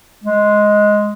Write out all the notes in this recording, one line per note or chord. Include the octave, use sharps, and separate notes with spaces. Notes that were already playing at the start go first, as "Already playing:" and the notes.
G#3